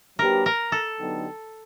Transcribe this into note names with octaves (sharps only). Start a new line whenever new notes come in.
F#3 A#3 D4 G4 A#4 B4
A#4
A4
D3 F#3 B3 D#4 G4